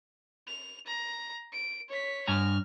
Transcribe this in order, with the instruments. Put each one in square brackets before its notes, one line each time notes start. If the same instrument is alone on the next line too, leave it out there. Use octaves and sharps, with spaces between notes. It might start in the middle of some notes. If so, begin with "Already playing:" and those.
[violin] F7
A#5
D7
C#5 B6
[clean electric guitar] G2 G#5 A#5 [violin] F6